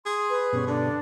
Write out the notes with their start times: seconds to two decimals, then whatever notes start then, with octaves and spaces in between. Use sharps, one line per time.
0.06 G#4 C6
0.30 B4
0.53 G2 B2 G3 C#4
0.68 D3 D4